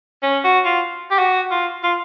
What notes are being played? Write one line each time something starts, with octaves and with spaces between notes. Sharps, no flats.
C#4
F#4
F4
G4
F#4
F4
F4